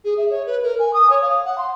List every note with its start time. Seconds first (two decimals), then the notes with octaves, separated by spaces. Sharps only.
0.05 G#4
0.18 E5
0.30 C#5
0.46 B4
0.63 A#4
0.79 G#5
0.94 D#6
1.10 C#5
1.22 F5
1.45 F#5
1.58 C6